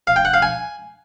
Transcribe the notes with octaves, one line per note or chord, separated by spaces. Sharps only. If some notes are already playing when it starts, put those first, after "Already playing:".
F5
G5
F#5
F5
G#5